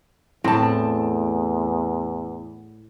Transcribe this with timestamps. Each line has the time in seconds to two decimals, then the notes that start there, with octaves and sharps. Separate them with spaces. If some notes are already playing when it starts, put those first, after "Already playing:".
0.44 E2 A2 C4 A5